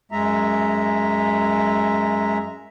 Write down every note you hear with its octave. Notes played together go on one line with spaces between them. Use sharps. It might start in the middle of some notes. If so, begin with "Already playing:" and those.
F#2 G#3 E5 A#5